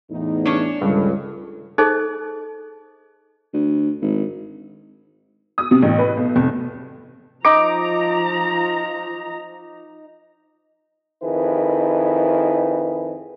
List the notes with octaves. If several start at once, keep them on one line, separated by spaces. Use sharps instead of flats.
E2 A2 D#4
C#4 D4 C#5
C#2 G2 D#3 G#4 A4
D#4 G#4 A4 C5 D#5
D2
G#1
D#6
C3
A1
B4
B1
F1
F3 D#4 A#5 D6
F2 D#3 E4 G#4 B4